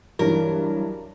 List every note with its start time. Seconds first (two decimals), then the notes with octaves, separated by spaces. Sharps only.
0.19 G2 E3 F#3 A#4